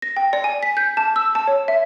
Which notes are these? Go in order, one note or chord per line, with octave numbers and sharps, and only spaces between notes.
A#6
G5
D5
G#5
B6
G6
A5
E6
A5
C#5
E5